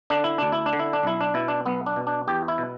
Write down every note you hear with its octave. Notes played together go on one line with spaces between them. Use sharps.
D3 D4
E4
D2 D4
E4
D4
D3
E4
D4
B1 E4
D4
B2 E4
D4
B1 B3
D4
B2
D4
E2 G4
E4
B2